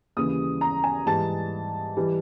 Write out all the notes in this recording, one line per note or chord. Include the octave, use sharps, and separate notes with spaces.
D#2 C#3 E3 G3 D#6
A#5
G#5
G#2 E3 G3 A5
E3 G3